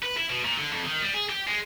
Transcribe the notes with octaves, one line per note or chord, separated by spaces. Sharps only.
B4
E4
B2
A#2
D3
F2
D#3
G3
G#4
G4
G#3